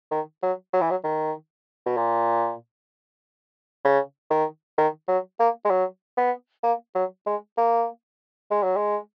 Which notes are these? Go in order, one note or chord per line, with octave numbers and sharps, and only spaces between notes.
D#3
F#3
F#3
E3
F#3
D#3
B2
A#2
C#3
D#3
D#3
F#3
A#3
G#3
F#3
B3
A#3
F#3
G#3
A#3
G#3
F#3
G#3